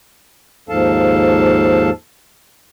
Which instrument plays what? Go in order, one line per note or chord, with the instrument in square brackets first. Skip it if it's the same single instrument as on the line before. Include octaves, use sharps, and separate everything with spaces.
[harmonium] D#2 G#2 F3 A4 F5 A5